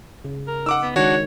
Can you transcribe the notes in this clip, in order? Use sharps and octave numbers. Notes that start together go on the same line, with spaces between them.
C#3
A#4
D#4 F#5 D6 E6
B3
D#3 G#3 D4 F#4 C#5